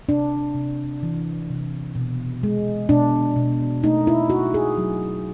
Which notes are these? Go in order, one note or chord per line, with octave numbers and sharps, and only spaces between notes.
C3 D4
C3
E3
C3
B2
G#3
B2 D4
B2
A3 D#4
E4
A3 F#4
G#4
F#3